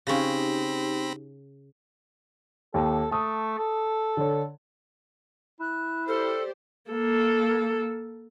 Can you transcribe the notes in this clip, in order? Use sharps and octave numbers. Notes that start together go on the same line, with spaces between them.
C#3 C4 C#4 D#4 G4 B5 A#6
D#2 A4
A3 A5 D#6
A4
D3 C#5
E4 F#6
G4 A4 C5 D5 F6
A#3 A4